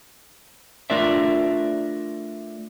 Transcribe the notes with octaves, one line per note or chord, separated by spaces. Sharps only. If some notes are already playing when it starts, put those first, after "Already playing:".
A3 D4 F4 A#4 D5 E5